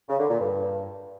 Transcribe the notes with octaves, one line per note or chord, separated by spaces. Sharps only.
C#3
D3
A#2
G2